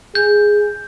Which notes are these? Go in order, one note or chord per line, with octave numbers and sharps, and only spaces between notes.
G#4 G6